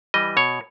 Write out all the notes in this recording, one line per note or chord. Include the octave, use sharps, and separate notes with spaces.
E3 G3 D#5
B2 C#5